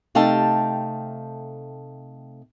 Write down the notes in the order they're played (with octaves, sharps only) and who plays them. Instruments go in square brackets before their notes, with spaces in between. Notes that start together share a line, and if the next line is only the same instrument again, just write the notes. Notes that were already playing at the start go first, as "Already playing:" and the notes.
[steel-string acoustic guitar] C3 A3 D#4 F5 G5 A5